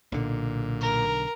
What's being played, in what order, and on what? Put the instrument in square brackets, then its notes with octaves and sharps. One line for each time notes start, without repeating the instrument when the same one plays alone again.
[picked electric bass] B1 D3 [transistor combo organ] A#2
[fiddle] A#4